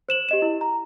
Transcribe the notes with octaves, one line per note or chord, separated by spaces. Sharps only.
C5 E7 F#7
G4 D#5 E7
E4
A#5